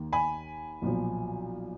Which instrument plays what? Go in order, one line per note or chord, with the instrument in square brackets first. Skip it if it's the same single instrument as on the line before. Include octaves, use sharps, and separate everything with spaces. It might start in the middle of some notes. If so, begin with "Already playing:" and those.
Already playing: [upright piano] D#2 D#3 A#3
G#5 B5
B1 A#2 F3